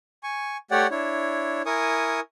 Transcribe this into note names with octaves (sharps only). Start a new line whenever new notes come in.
G#5 C#6
A3 G4 C#5 D5 F#5 G5
D4 E4 C#5
E4 A#4 G#5 C#6 D#6